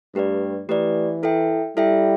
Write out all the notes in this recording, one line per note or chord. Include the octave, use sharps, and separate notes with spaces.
G2 A3 G4 B4 D5
E3 A3 G4 B4 D5
E4 A4 E5 G5
G3 E4 A4 E5 G5